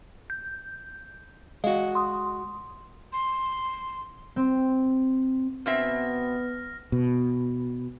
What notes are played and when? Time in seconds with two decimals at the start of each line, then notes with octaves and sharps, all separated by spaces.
0.30 G6
1.64 G#3 F#4 D#5 F5
1.95 C6 D#6
3.13 C6
4.36 C4
5.66 B2 B3 C4 E5 F6 A#6
6.92 B2